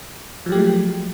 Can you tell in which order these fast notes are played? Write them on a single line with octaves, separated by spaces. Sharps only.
F3 F#3 G4 A3 G#3